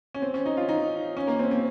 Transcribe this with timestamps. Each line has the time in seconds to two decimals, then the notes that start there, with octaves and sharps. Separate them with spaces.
0.14 C#4
0.22 C4
0.34 C#4
0.46 D#4
0.57 F4
0.69 D#4
1.17 C#4
1.27 A#3
1.39 C4
1.51 C4